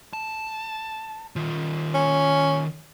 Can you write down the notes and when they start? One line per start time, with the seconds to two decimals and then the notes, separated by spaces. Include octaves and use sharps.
0.13 A5
1.36 D#3 F4
1.94 C#4